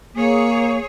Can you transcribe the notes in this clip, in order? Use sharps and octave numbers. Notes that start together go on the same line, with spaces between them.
A#3 G#4 C#5